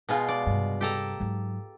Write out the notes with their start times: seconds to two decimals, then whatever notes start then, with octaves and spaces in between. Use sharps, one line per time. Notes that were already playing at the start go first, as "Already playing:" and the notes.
0.09 B2 G#3 F4
0.28 D5
0.47 G2 C3
0.81 G4 A4 A#5
1.20 G#2 F#3